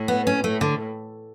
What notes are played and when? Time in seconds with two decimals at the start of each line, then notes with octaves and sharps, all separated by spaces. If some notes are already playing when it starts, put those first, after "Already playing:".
Already playing: A2
0.08 B3
0.27 C#4
0.44 A2 A3
0.61 D3